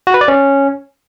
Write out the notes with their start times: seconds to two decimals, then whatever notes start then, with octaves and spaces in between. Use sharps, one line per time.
0.07 F#4
0.14 B4
0.21 D5
0.28 C#4